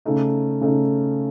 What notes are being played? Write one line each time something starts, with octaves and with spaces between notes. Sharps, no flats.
C#3 A3 D#4
C#3 A3 D#4